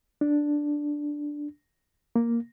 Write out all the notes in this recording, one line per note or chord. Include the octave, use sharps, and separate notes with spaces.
D4
A#3